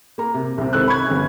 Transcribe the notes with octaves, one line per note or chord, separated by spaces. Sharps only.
A#3 A#5
C3
C2 C3 C4
G#1 A4 E6 F#6
B5 C#6 G#6
G1 C#4